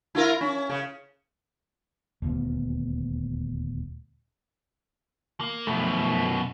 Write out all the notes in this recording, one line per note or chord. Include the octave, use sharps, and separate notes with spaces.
E4 F4 A#4
C#4
C#3
D#1 D2 B3
A#3
F#2 B2 F3 A3